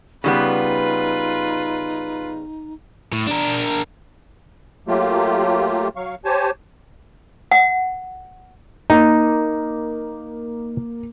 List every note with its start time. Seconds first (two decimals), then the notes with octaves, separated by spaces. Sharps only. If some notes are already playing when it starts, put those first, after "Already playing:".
0.24 C#3 G3 B3 D#4 F4 B4
3.13 A2
3.27 D4 A#4
4.88 F#3 A3 A#3 F4 G4
5.96 F#3 F5 C#6
6.25 G4 C5 C#5 G#5 A5
7.51 F#5
8.90 A#3 D#4